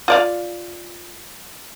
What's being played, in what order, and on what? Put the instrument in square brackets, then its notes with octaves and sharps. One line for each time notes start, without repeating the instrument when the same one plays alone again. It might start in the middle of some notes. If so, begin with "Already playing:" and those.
[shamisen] F4 D5 F5